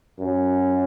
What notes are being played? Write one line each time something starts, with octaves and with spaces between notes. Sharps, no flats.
F#2